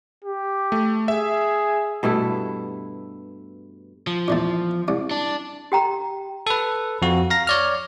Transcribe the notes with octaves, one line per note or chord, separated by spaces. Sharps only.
G4
A3
G#4 E5
G2 B2 A3 E4
F3
A#1 E2 A3
C2 C3
D4
G4 G5 A#5
A4 B4
F2 F#4
F5 A#5 A#6
C#5 D5 F6